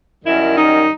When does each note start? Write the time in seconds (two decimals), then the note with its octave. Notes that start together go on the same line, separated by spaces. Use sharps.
0.24 F#2 D#3 G3 E4
0.55 D#4